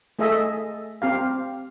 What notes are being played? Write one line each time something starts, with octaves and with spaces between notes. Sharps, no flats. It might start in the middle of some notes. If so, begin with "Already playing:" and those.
A3 G#4 A4 D#5 E5
C4 G4 F5